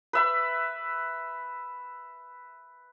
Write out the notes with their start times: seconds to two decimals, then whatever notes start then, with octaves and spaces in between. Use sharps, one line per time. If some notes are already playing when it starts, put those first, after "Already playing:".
0.13 B4 E5 B5